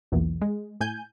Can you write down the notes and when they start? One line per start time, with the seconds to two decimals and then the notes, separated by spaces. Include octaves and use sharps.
0.12 B1 E2 A#2
0.42 G#3
0.81 A2 G#5 G6